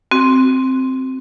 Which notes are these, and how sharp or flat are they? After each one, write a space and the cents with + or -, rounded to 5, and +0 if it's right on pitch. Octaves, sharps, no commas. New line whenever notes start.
C4 +0 F#4 +0